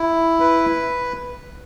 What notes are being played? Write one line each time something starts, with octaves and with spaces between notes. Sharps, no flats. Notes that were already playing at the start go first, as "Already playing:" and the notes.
Already playing: E4
B4